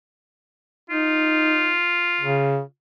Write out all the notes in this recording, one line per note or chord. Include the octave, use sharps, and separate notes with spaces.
D#4 F4
C#3